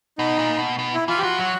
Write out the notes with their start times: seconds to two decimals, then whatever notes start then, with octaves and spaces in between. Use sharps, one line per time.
0.18 B2 D#4
0.39 A#2
0.59 B2
0.79 B2
0.94 E4
1.08 E3 F4
1.18 G4
1.23 F3 F#4
1.38 F#3